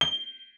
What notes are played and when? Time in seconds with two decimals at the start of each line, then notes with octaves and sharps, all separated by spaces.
0.01 G7